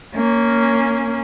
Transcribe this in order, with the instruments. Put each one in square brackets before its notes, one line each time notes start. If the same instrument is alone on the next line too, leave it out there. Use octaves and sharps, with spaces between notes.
[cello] A#3 C#4